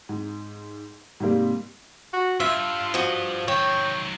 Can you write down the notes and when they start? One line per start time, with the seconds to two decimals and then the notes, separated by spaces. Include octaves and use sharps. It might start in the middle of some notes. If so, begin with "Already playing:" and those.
0.09 G#2
1.20 G#2 C3 G3 A#3
2.13 F#4
2.40 G2 F4 E5
2.94 F3 F#4 D#5
3.48 D#3 F#3 C#5 G5